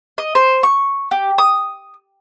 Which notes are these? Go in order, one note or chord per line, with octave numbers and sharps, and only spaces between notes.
D#5
C5
C#6
G4
D#6